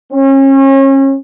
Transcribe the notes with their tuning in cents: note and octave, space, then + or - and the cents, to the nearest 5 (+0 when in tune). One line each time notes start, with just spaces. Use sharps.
C#4 -35